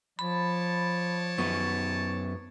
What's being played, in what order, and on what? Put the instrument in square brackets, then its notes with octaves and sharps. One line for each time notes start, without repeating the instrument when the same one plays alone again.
[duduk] F3 [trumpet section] C#5 D5 A5 [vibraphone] B5
[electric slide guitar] F#2 B3 [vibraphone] C#6